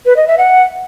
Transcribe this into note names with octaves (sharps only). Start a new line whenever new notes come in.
B4
D#5
E5
F#5